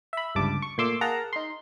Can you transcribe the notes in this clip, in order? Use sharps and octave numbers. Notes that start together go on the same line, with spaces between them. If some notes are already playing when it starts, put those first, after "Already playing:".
E5 B5
G1 C#2 G2 A5 D6
C#6
A#2 A3 C6 D6 E6
G#4 A#4 F5 F#5 A5 A#5
D#4 C6